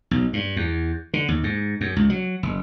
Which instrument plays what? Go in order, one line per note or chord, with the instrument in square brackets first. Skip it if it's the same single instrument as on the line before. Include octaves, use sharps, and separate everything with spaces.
[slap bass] B1
G2
E2
D3
D#2
G#2
F#2
C#2
F#3
F#1